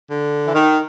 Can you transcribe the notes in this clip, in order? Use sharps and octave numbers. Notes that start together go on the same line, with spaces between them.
D3
E3
D#3